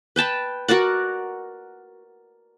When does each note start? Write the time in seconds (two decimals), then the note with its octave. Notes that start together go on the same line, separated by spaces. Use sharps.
0.16 B4 G5 A5 B5
0.68 F#4 A#4 D5 F#5